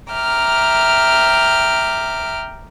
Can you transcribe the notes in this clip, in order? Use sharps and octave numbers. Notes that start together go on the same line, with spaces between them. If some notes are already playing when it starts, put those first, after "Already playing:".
E5 G5 A#5 D6 F6